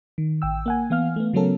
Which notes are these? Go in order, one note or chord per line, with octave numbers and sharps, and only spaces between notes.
D#3
A1 G5 E6
A#3 F#5 G#5
E3 B3 F5 F6
A3 B3
C#3 F#3 B3 C#4 A4 A#4